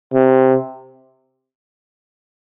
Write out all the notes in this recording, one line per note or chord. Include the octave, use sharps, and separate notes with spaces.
C3